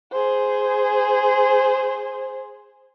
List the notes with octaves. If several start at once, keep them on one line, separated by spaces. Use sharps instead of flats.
G#4 C5